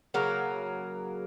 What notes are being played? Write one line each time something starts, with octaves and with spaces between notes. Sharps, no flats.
C#3 F#3 A#3 A#4